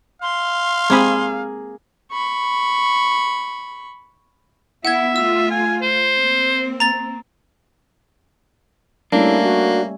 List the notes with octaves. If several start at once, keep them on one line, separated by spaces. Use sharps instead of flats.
F5 C6
G#3 A#3 C4 G#4 B5
B5 C#6
B3 E4 E5 F#5 G#6
A3 F4 E6
G#5
C5
A#3 C4
A#5 A6
G3 A3 A#3 C#4 D4 E4
F#4